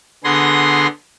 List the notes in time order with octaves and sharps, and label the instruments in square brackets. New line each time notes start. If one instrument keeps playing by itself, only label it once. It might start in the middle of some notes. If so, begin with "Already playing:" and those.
[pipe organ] D3 B3 G#4 C6 A#6